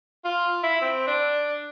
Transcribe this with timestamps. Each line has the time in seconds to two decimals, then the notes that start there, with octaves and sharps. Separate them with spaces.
0.24 F4
0.63 E4
0.82 C4
1.07 D4